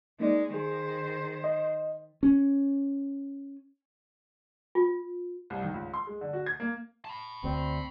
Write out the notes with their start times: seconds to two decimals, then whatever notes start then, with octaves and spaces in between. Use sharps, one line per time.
0.20 G#3 A#3 D#4 D5
0.54 D#3 G#4 C5
1.44 D#5
2.23 C#4
4.75 F4
5.50 C2
5.62 D#3
5.74 C#2
5.94 C6
6.07 G#3
6.21 D3
6.33 F#4
6.46 G#6
6.60 A#3
7.05 A5 B5
7.44 D2 C4